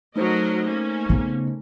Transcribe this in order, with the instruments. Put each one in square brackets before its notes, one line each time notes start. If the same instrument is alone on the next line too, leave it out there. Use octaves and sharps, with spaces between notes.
[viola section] F#3 A#4 D#5 [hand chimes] A3 D#4 C5
[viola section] A#3 C#4
[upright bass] C#3 B3